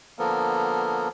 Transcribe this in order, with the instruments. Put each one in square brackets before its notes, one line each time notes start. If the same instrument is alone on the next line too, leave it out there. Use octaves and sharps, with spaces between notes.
[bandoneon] D3 F3 A#3 B3 A4 A#4